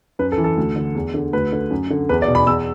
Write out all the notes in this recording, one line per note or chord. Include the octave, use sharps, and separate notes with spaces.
F#2 B4
A4
E3
A4
D2
D3
E2
D3
D2 B4
D3
F#2
D3
E2 B4
D5
B2
B5
E2 E6